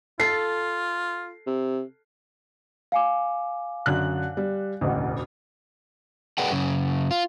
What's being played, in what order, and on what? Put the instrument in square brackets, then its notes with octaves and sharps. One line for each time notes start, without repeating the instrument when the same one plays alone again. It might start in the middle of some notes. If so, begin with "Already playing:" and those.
[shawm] F4 [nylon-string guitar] A4 [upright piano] C7
[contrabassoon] C3
[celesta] F5 G#5 D6
[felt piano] F#2 D3 F#6
G3
E1 A1 D2
[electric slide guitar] G#4 B4 D5 F#5 G5
F#2 C#3
F4